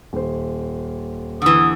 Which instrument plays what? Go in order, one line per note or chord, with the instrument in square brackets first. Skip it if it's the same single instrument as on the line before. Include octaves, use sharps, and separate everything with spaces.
[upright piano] D#1 C5
[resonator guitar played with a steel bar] D3 E3 [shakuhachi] D#6